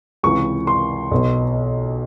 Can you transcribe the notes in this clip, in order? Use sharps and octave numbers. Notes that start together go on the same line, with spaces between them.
C#2 C3 E3 C#6
C6
B1 B2